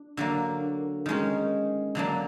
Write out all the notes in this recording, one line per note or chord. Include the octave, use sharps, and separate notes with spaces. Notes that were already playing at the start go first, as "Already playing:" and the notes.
Already playing: D4
D3 F#3 A#3
D#3 G#3 C#4
D3 F#3 A#3 D4